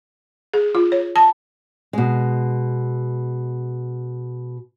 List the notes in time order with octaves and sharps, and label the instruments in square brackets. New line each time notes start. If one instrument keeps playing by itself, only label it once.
[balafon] G#4
F4
C#5
A5
[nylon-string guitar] B2 G#3